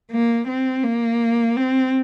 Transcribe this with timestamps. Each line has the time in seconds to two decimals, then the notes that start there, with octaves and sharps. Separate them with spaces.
0.11 A#3
0.48 C4
0.84 A#3
1.56 C4